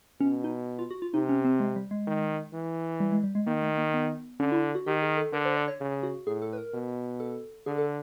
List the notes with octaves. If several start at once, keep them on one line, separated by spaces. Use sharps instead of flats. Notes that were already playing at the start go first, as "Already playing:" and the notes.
B2 C#4
D#4
F4
F#4
F4
C3 D#4
C#4
C4
G#3
G3
G#3
D#3
E3
G3
G#3
G3
G#3
D#3 A#3
A3
A#3
B3
D3 C#4
E4
F#4
D#3 G4
G#4
A4
D3 A#4
C5
D5
C#5
C#3
F#4
A2 G#4
A4
B4
A#4
B2
A4
D3 G#4
A4